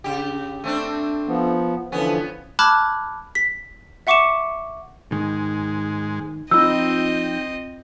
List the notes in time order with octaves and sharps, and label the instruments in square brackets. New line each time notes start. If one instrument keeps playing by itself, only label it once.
[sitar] C#3 G4
A3 C4 D4
[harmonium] F3 B3
[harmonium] D3 E3 F3 [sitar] B3 C#4
[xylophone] A5 B5 D6 F6 F#6 G#6
B6
E5 F#5 C#6 D6 C#7 E7
[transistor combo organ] G#2 G#3 [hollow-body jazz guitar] D#3
[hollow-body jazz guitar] F3 D#4 [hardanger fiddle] C4 D#5 [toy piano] F4 E6 [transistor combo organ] G5